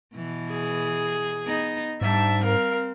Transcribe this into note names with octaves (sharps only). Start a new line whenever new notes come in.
B2 E3
G#4
B3 D#4
G#2 G3 D4 E5 A5
C4 A#4 F5